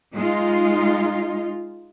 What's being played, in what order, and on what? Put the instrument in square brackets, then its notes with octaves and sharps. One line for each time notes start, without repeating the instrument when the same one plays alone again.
[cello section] G#3 D#4 F4